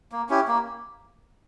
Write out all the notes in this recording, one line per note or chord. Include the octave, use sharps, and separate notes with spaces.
A#3
C#4 E4 G4
A#3